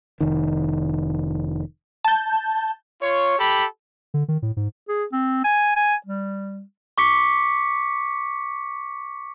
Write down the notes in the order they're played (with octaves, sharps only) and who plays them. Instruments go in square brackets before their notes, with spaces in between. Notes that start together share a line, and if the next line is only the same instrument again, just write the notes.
[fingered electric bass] F1 D#3
[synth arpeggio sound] A5 G6
[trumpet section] F4 C#5
G4 A4 B5
[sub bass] D3
D#3
A2
G#2
[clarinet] G#4
C4
G#5
G#5
G3
[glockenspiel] C#6 D6 B6 C#7